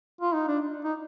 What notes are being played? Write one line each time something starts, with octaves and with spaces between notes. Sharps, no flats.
F4
D#4
D4
D#4